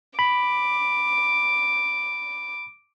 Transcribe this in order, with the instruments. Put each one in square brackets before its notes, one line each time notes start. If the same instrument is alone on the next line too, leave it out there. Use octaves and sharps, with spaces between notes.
[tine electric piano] B5 [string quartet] D6